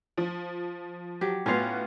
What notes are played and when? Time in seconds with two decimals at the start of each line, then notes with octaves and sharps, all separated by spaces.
0.17 F3
1.21 F#3 G4
1.46 A2 B3 C#4 F4 F#4 F5